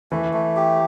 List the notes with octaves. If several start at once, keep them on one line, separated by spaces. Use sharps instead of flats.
E3 A3
A3
G4